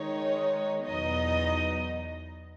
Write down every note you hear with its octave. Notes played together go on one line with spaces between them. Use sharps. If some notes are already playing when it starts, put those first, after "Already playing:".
Already playing: D#3 G#3 D#4 C#5
E2 B2 F#3 B3 D#4 D#5